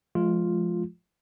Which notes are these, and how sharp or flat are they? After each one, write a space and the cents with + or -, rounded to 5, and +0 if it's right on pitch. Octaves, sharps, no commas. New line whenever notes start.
F3 +0 G#3 +35 F4 +0